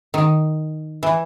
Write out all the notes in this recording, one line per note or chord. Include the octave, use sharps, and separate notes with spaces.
D#3
E3